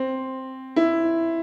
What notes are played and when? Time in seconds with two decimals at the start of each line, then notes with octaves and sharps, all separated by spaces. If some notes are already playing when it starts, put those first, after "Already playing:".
Already playing: C4
0.76 E4